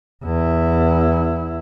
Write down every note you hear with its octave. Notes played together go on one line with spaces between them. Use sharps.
E2 E4